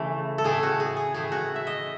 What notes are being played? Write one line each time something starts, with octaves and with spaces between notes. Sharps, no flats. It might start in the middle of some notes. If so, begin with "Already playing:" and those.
Already playing: C#3 E3 A3
A4
A2 E3 A3 G#4
F#4
G#4
G#4
A2 E3 A3 G#4
F#4
E5
D#5